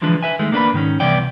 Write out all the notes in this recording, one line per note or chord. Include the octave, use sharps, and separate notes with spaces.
D3 E3 F3 G#3 D4 B4
B4 E5 G#5
D#3 G#3 A3
A#3 D4 B4 B5
G#2 D#3 C#4
C2 C3 E3 B3 D5 G5